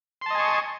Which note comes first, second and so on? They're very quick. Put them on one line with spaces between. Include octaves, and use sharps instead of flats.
C6 A5 D#5 G#5 C#6